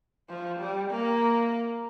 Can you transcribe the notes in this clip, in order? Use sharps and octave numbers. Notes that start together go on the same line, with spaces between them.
F3
G3
A#3